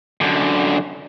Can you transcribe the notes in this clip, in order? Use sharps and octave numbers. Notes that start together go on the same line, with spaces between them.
F#2 D3